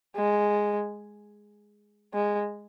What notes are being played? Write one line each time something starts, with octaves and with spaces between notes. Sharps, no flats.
G#3
G#3